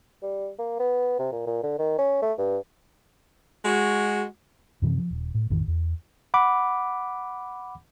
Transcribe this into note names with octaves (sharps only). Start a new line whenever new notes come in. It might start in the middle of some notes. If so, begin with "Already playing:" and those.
G3
A#3
B3
C3
A#2
A#2
D3
D#3
C#4
A3
G2
G#3 F#4
F#2 C3 E3 C4
F3
D#1
A2
A1 F2 D#3
E2
F#5 B5 D6